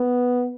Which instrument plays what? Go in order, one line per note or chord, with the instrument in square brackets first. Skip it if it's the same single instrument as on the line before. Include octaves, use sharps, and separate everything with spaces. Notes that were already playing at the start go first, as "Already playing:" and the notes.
Already playing: [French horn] B3